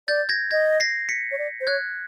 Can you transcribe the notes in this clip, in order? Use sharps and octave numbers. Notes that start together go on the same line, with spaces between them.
D5 G6 A6
G#6 A#6
D#5 G#6 A#6
A#6 C7
B6 C#7
C#5
D5
C5
C#5 F#6 G#6